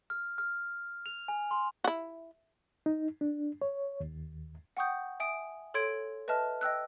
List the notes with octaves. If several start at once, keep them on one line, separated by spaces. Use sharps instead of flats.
F6
F6
F7
G#5
C6
E4 F#4
D#4
D4
C#5
D#2
F#5 G5 C#6 D#6 G6
E5 G#5 D#6 D7
A4 C#5 C6 G#6 D7
B4 D#5 E5 A5 F6
D#5 G5 E6 F#6